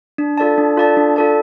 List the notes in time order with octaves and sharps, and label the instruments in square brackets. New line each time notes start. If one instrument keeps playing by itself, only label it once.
[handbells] D4
F4 A4 D5 A5
D4
F4 A4 D5 A5
D4
F4 A4 D5 A5